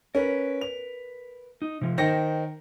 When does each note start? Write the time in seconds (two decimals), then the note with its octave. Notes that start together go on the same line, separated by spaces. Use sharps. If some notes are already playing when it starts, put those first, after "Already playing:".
0.15 C#4 A#4 B4
0.61 F7
1.62 D#4
1.81 C3 F3
1.98 D#3 C5 D#5 G5 A#6 C#7